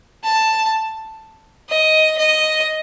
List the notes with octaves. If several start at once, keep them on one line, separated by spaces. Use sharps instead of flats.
A5
D#5
D#5